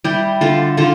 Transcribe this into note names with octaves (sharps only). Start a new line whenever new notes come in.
G3 E4 G4
D3 F4 A4
D3 F4 A4